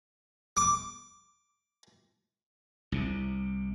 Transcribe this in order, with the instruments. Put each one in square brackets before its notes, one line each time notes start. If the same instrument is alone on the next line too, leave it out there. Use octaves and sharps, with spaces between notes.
[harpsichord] D6
[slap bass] C2 C3